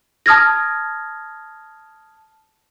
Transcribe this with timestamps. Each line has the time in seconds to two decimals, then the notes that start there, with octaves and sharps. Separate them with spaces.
0.26 A5 D#6 F6 G#6 A#6